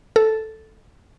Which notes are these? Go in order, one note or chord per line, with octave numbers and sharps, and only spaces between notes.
A4